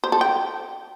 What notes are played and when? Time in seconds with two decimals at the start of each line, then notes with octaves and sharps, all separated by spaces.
0.04 C5
0.12 A4
0.21 G5